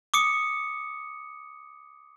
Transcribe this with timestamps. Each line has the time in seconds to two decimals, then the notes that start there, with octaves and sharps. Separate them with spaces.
0.14 D6 D#6 C#7